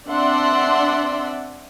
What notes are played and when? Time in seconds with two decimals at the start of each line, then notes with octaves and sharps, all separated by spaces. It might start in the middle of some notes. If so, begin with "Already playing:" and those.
0.10 C4 D4 D5 E5 F#5 C6